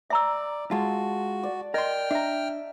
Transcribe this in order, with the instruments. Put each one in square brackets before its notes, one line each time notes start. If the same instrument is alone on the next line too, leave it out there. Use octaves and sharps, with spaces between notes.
[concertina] D5 [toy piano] E5 A#5 E6
[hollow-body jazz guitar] G#3 F4 [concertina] F#4 [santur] A5
[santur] D5
[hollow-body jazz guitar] A#4 C6 [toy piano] D#5 [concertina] G5 F6
[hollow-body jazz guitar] D4 A#5 [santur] E5